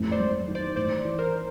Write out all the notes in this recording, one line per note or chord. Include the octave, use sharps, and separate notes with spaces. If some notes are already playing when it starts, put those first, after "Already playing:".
Already playing: A1 F2
C5 D5
F#3
D#3
C5 D5
A1 C5 D5
E3
A#4 C5